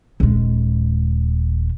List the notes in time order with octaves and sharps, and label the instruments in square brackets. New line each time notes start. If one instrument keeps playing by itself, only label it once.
[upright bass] D#1 G#3